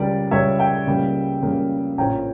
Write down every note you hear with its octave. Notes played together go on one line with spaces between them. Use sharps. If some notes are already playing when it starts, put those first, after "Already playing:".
Already playing: C#2 C#3 G3 A#4 D5
C#2 C#3 G3 C#5 E5
E5 G5
C#2 C#3 G3 A#3
C#2 C#3 G3 A#3
A#1 A2 F3 A#3 C#4 G5 A#5